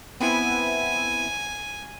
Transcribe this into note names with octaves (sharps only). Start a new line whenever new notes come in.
B3 C4 E4 G#5